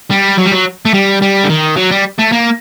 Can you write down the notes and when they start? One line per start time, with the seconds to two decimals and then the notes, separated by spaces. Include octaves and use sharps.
0.11 G3
0.38 F#3
0.45 G3
0.52 F#3
0.85 A3
0.94 G3
1.22 G3
1.44 D3
1.49 D#3
1.77 F#3
1.91 G3
2.19 A3
2.33 A#3